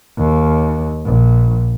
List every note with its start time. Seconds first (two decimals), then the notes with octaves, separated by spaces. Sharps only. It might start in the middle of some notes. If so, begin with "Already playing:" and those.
0.18 D#2
1.06 A#1